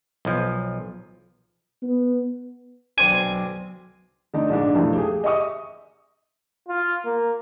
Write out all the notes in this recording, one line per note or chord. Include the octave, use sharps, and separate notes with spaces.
B1 F3
B3
B1 C4 D4 G#5
D3 A3 D#4 D5
A#1 G#2 D4
B1 F2 E3 F3 A3
G4 G#4
D#5 E5 C#6 D#6
F4
A#3